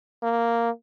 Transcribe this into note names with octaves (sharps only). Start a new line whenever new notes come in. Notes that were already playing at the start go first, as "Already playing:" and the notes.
A#3